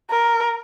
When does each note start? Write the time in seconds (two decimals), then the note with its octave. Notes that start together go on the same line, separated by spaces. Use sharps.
0.10 A#4